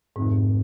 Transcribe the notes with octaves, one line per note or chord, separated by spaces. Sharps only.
F1 F2 G#2 C3 D#3